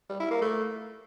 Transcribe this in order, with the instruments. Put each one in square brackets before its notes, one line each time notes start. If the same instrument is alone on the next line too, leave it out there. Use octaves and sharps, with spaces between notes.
[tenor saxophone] G3
E4
A#3
A3